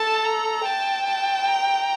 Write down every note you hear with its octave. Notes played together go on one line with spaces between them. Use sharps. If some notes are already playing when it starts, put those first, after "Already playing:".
Already playing: A4 A5
A#5
G5 A5
A5
A#5